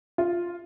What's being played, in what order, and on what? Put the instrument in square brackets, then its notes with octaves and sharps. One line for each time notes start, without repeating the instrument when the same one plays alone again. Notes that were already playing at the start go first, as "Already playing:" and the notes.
[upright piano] F4